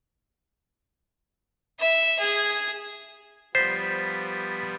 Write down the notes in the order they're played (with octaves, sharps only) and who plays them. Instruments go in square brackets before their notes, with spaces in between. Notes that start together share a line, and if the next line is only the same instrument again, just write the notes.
[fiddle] E5
G#4
[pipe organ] F3 G3 B3 [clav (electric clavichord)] C5 [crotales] A6 B6